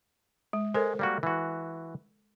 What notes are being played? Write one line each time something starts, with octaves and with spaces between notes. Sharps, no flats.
G#3
G#3 A4 A#4 C5
G3 A#3 F#4
E3 F#4